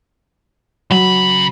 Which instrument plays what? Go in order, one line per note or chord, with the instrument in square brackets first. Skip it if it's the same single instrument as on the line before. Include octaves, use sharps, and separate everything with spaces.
[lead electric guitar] C#3 B5 [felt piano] F#3